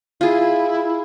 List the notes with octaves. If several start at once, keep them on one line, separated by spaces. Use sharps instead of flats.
E4 F4 G#4